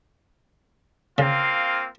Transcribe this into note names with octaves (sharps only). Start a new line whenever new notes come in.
C#3 A#3 C4 F4